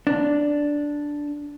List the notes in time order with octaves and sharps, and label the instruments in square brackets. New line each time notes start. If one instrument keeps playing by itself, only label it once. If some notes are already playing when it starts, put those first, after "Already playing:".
[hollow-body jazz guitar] D4